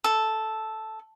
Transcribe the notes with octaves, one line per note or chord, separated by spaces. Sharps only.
A4